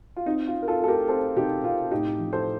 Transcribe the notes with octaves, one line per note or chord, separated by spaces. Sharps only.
F4
C4 D#4
F4
C4
A#4
F4 A4
A3 A4
G4 A#4
C4 A4 C5
C3 D#4 G4
C3 F4
A2 D#4 G4
F3
A4 C5